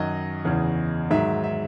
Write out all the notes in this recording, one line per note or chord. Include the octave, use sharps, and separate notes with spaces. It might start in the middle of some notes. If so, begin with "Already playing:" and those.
Already playing: F#2 D#3 F#3 D#5
E2 C#3 E3
G#2 D#3 F#3 E5
E5